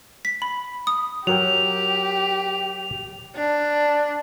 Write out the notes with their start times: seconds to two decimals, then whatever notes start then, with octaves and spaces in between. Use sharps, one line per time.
0.25 B6
0.42 B5
0.87 D#6
1.27 F#3 G4 A#4 G5 F7
3.36 D4